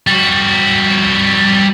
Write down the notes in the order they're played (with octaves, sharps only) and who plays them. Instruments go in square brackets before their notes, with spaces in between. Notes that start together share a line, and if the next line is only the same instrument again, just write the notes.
[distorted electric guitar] G3 F#4